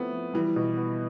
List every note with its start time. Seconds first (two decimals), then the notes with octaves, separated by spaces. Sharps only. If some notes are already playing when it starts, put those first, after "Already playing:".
Already playing: F3 A3 B3 C4 E4
0.13 F3
0.34 E3 G3
0.56 B2
0.77 B3